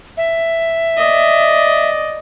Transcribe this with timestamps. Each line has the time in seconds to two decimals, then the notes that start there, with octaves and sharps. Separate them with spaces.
0.17 E5
0.97 D5 D#5